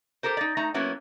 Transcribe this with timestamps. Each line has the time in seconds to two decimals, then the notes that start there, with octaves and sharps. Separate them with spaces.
0.23 G4 A4 A#4 C5
0.37 D#4 D5
0.57 A3 D#4 A#5
0.74 F#3 A#3 B3 C#4 E4 F#4